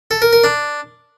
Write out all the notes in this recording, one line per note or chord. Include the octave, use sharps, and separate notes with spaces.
A4
A#4
A#4
D4